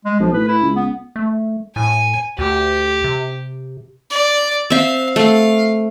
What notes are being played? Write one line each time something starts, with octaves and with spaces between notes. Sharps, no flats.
G#3
B1 F3
A2 B4
E4
C#2
B3
A3
A2 G#5
D2 G4
C3
D5
C4 E5 F5
A3 F5